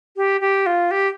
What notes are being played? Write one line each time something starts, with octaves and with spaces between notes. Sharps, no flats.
G4
G4
F4
G4